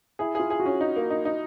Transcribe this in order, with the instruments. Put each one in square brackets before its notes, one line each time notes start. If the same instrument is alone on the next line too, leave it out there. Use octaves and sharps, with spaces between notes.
[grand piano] E4 [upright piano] G#4
[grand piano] F4 [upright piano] G#4
[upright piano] G#4
[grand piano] F#4
[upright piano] C#4
D#4
A#3
D#4
D#4